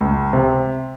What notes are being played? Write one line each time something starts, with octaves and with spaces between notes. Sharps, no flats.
C#2
C3